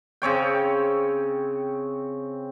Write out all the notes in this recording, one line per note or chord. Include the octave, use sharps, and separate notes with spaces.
C#3 C4 C#5 G5